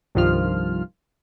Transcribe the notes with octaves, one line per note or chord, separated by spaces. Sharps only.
C2 G2 D#3 F3 F4 F6